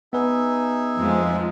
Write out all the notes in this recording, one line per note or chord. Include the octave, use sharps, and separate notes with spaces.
B3 D#4 G#4 B4 E5
F2 F3 G#3